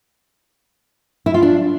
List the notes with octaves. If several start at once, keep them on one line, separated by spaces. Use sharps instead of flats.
E4
F4
D4